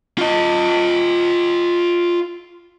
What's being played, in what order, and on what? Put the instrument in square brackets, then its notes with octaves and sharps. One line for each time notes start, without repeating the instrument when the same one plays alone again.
[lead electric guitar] F4 D#5